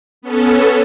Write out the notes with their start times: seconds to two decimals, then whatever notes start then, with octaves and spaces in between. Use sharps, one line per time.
0.22 B3 C#4 A4